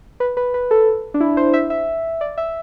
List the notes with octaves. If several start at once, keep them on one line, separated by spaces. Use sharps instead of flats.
B4
B4
B4
A4
D4
E4
C5
E5
E5
D5
E5